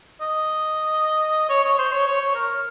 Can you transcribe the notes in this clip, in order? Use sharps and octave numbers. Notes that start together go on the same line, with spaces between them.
D#5
C#5
C#5
C5
C#5
C#5
C#5
A#4